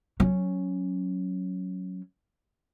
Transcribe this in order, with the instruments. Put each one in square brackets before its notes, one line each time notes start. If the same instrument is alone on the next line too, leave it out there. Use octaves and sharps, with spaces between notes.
[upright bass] F#3 C#4